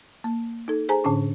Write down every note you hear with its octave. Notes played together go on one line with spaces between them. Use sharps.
A#3
D#4 A4
G#4 C5 G#5 A#5
A2 D3 C#4 D4